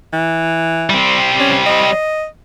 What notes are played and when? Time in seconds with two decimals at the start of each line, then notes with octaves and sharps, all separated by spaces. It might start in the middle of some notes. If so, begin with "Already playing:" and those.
0.13 E3
0.90 G3 C4
1.40 C#4
1.66 D#5